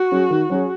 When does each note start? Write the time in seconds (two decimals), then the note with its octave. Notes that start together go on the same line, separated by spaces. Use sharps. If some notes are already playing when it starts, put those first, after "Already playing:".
Already playing: F#4
0.12 F#3 C#4 G#4
0.31 D#3
0.50 F#3 C#4 G#4